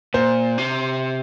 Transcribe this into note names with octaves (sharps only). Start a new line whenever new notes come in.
A#2 C5
C3